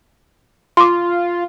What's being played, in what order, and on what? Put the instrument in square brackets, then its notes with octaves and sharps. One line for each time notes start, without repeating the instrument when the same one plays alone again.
[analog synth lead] F4 [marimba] C6 D6